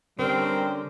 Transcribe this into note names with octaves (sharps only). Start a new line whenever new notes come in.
D3 G3 C4 C#4 A#4